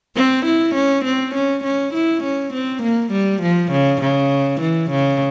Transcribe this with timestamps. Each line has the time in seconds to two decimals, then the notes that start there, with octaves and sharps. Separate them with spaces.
0.16 C4
0.45 E4
0.75 C#4
1.04 C4
1.34 C#4
1.64 C#4
1.94 E4
2.23 C#4
2.54 C4
2.82 A#3
3.12 G3
3.42 F3
3.72 C#3
4.01 C#3
4.61 E3
4.91 C#3